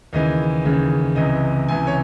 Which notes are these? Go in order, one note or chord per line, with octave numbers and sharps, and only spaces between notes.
D#2 C#3 E3 D#5
D#2 C#3 E3
C#2 C3 E3 D#5
C#2 C3 E3 G#5
C#5